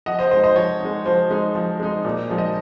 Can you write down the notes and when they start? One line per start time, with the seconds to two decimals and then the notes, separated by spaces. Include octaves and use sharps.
0.06 F3 D#5 F#5
0.19 C5 D#5
0.31 G#3 D#4 C5 D#5
0.44 C5 D#5
0.56 F3 C#5
0.80 G#3 D#4
1.06 F3 C5
1.30 G#3 D#4
1.55 F3
1.80 G#3 D#4
2.05 A#2
2.29 F3 G#3 D#4
2.38 D#5